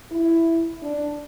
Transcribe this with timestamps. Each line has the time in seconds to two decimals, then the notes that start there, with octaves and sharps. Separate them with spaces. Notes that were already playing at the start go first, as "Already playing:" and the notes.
0.11 E4
0.82 D4